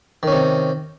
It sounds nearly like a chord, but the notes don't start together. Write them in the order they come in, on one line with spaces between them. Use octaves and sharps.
D#3 C#4 C3